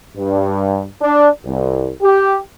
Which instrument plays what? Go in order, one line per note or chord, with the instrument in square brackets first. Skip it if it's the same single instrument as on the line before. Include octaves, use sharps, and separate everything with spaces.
[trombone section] G2
D4
C2
G4